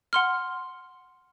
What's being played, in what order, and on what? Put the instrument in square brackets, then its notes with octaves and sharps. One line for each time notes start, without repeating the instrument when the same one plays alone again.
[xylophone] F#5 C6 F6